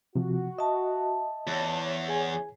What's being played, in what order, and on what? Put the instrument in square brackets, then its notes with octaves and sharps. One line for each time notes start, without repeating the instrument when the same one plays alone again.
[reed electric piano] C3 F3 [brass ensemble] F#4
[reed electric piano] D#5 [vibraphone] E5 A5
[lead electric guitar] E2 [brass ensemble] E3 C#5
[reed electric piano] G#4 G#5